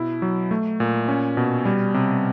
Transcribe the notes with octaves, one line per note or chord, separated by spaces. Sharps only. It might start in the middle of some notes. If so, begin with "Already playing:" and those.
Already playing: B2 E4
F#3
A3
A#2
C#4
B2
G3
C3